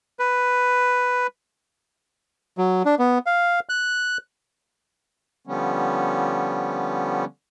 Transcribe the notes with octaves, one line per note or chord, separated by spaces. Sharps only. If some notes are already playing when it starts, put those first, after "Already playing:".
B4
F#3
D4
B3
F5
F#6
D3 F3 G3 B3 C#4